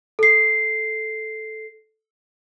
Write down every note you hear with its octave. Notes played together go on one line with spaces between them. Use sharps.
A4 C7